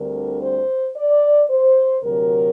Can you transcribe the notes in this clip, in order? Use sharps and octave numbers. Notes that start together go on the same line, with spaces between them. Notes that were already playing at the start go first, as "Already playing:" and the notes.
Already playing: D2 D3 G3 C4 A#4
C5
D5
C5
D2 C3 F#3 A#4